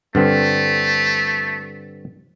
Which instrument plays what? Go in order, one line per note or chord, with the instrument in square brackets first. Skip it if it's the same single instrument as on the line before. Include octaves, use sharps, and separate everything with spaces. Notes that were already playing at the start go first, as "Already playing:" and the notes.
[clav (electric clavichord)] G2 D3 C4 [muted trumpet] A3